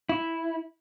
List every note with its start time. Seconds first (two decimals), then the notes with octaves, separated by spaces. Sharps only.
0.09 E4